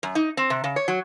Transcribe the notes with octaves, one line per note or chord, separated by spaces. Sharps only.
F#2
D#4
C4
C3
C#3
C#5
F#3